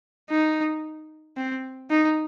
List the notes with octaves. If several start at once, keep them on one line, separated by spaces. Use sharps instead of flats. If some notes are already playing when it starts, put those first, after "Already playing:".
D#4
C4
D#4